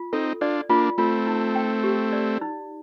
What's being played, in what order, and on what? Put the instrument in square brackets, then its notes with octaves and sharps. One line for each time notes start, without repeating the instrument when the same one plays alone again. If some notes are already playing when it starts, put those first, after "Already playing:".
Already playing: [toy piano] F4
[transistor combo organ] C4 D#4 [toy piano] A4
[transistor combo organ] D4 F4 [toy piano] D5
[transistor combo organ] A#3 D4 [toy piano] F4
[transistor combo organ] A3 C4 [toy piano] F4
[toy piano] D#4
G5
G4
D5
D#4